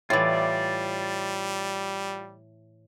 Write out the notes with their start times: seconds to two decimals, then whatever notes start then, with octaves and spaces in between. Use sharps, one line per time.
0.10 A2 E3 G3 F4 D5